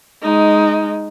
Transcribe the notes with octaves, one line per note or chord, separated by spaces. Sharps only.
G#3 D#4